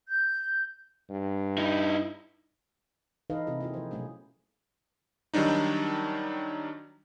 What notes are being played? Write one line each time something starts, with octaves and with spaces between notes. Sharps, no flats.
G6
G2
D#4 E4
E3 D#4 A4 B4 D#5 F5
C3 C4 E4 G#4
A#3 E4 F4 G#4
F3 C5
B2 F#3 A3 C#4 G#4
D#3 F#3 G3 D4 D#4